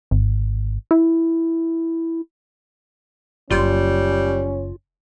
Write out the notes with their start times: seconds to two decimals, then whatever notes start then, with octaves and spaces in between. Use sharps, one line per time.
0.11 G#1
0.91 E4
3.50 F#1 G3 C#4 F4